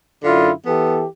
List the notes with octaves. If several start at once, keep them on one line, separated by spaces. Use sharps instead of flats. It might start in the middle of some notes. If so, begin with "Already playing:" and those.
F#2 D3 E4 F4
E3 B3 G4 A4